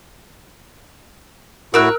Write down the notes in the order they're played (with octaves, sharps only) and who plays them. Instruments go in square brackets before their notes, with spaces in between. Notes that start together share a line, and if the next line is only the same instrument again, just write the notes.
[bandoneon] A2 E4 F#4 [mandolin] A#4 E6 F#6